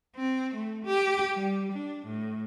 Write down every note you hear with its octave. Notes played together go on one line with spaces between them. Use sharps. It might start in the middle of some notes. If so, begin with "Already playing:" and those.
C4
A3
G4
G3
D4
A2